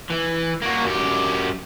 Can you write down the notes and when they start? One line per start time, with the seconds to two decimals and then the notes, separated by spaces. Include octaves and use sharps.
0.10 E3
0.62 A#3 F#4
0.85 F#2 G4